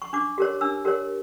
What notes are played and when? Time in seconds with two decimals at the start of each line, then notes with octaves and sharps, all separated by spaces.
0.02 C#6
0.13 D4 D6
0.38 G4 A#4 C#5
0.61 D4 E6
0.85 G4 A#4 C#5